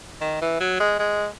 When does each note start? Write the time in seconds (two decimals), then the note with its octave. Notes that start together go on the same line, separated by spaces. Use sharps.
0.21 D#3
0.41 E3
0.60 F#3
0.80 G#3
0.99 G#3